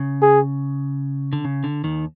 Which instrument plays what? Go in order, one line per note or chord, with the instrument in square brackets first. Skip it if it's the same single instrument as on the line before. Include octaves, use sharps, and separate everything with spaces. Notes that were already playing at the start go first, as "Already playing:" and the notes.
Already playing: [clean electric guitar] C#3
[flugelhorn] G#4
[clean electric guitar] D3
C#3
D3
D#2 D#3